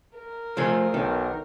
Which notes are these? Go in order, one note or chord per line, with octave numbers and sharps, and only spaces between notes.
A#4
F3 A3 G#4
B1 D#3